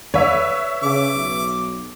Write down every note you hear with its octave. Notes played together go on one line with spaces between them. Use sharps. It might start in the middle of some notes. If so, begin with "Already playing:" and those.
B4 C#5 D5 E5
C#3 D6
B1